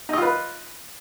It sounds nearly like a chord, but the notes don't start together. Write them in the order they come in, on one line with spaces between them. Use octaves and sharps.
D#4 D#5 F4 B4